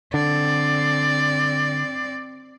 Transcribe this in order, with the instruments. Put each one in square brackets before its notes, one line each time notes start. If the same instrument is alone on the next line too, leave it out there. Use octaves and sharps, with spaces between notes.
[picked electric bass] D3 [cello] C4 D5